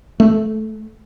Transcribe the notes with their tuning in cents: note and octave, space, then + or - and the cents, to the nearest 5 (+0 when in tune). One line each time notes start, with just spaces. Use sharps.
A3 -15